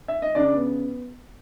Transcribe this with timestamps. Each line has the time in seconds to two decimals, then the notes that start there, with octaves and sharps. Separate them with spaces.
0.08 E5
0.22 D#5
0.35 C#3 D4 D5
0.55 B3